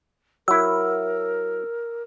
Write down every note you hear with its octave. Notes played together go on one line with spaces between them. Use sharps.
F#3 E4 A#4 E6